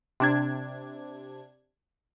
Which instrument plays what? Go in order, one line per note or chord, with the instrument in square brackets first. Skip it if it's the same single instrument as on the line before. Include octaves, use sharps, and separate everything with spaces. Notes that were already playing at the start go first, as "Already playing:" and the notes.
[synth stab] C3 D4 G#6